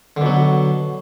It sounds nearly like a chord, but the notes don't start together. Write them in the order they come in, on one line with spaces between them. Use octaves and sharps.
D3 B2 F#3